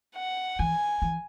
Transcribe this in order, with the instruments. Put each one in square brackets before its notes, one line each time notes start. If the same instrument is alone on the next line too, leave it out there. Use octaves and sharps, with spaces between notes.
[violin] F#5
[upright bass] E3 [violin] G#5
[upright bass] E3